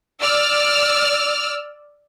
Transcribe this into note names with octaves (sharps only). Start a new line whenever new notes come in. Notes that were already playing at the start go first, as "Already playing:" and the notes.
D5 E6 F6